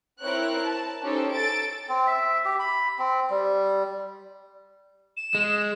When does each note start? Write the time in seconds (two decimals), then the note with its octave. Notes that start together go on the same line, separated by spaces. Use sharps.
0.22 C4 E4 A#4 C#5 F#6
0.65 A5
1.03 C#4 D#4 G4 A4 C5
1.32 A4 A6 D7
1.89 C4
2.07 E5
2.45 G4
2.59 B5
2.99 C4
3.30 G3
5.17 E7
5.35 G#3